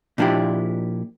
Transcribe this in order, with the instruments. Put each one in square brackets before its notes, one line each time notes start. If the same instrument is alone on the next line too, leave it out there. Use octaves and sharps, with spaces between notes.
[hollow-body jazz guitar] A#2 F3 D4 E4 G4